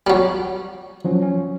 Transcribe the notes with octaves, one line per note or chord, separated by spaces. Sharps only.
F#3 G3
F3 F#3 C#4
C#4